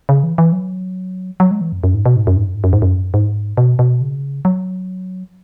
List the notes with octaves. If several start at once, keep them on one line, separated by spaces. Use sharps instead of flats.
C#3
E3
E3
F#3
F#3
G#3
E3
F#2
F#2
G#2
B2
G#2
F#2
G#2
F#2
G#2
F#2
G#2
F#2
G#2
B2
B2
C#3
F#3